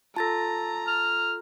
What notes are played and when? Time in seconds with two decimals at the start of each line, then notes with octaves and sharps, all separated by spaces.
0.16 F4 A4 A5 A#5 A6 A#6
0.87 F6